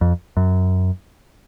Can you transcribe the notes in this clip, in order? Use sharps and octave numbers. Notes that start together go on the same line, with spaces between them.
F2
F#2